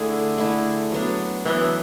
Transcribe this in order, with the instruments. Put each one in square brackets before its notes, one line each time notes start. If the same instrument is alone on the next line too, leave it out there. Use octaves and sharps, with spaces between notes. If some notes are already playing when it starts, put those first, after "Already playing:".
Already playing: [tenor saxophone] D3 [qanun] A3 E4 G#4
[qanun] A3 E4 G#4
F#3 B3 D4
[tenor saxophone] E3 [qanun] F#3 B3 D4